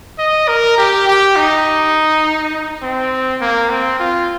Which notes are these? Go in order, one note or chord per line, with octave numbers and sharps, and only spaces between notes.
D#5
A#4
G4
G4
D#4
C4
A#3
C4
F4